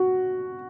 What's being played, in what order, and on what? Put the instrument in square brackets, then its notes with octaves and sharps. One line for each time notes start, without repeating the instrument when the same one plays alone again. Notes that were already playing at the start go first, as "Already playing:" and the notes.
Already playing: [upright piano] F#4